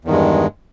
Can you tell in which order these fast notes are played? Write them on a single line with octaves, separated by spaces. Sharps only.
E2 D#3 G2 G#3